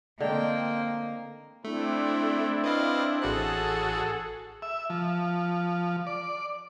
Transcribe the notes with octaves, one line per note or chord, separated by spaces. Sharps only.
D3 A#3 C4 D#5 G5
A3 C4 D4 E4
B4 D#5 F5
A1 F#4 G#4 A4 F#6
E5
F3
D5